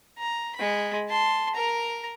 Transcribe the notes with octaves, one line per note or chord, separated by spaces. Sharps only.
A#5
G#3 B5
A5 C6
A#4 A#5